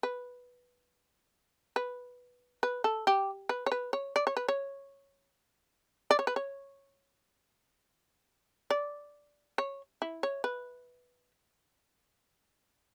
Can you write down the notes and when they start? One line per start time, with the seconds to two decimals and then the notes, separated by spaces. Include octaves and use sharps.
0.03 B4
1.76 B4
2.63 B4
2.84 A4
3.07 G4
3.49 B4
3.66 C#5
3.72 B4
3.93 C#5
4.16 D5
4.27 C#5
4.37 B4
4.48 C#5
6.11 D5
6.19 C#5
6.27 B4
6.36 C#5
8.71 D5
9.58 C#5
10.02 E4
10.23 C#5
10.44 B4